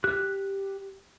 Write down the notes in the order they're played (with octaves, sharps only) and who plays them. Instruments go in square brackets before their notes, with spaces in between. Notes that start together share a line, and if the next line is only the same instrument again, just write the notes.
[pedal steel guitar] G4 F#6